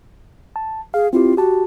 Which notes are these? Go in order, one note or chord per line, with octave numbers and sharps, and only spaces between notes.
A5
G#4 F5
C4 E4 F4 G4
F#4 G4 A5